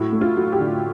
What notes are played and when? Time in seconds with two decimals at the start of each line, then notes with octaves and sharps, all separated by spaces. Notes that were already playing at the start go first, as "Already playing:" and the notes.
Already playing: A2 F#3 E4
0.12 A3
0.21 F4
0.37 F#3
0.52 G4
0.59 D3